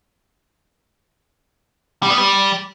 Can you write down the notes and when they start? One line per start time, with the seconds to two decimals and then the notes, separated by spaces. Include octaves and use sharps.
2.03 G3
2.11 B3
2.18 G3